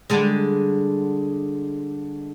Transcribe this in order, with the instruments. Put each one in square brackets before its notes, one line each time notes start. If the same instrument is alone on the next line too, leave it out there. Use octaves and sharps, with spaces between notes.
[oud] D3 G3 G#3